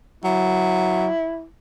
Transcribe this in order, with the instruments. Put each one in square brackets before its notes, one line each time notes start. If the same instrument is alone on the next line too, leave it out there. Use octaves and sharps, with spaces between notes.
[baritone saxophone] F#3 [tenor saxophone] E4